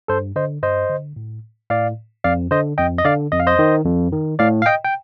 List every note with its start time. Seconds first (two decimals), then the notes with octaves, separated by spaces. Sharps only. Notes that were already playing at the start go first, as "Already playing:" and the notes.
0.08 G2 A4 C5
0.36 D3 C5 D#5
0.62 G2 C5 D#5
0.90 D3
1.16 A2
1.70 A2 D5 F5
2.24 F2 D5 F5
2.51 D3 C5 D#5
2.78 F2 D#5 G5
2.98 D#5
3.05 D3 D5 F5
3.32 F2 D#5
3.40 F5
3.47 C5 D#5
3.59 D#3
3.86 F2
4.12 D#3
4.39 A2 D5 F5
4.62 F5
4.66 D#5 G5
4.85 G5